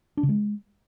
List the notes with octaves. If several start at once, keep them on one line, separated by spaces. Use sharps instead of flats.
D4
C#3
G#3